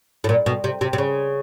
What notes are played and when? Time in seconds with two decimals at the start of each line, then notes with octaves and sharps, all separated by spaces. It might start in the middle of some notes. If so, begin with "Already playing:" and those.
0.24 A2
0.29 A#2
0.46 B2
0.64 C3
0.81 C3
0.93 C3
0.98 C#3